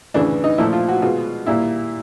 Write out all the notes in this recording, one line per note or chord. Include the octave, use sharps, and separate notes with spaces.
D2 C#3 E3 D4
D#4
A#2 F3 A3 E4
F4
F#4
B2 G#3 B3 F4
A#2 G3 A#3 E4